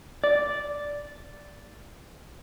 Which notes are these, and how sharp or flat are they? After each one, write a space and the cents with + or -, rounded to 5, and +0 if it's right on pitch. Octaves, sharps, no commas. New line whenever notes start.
D5 -5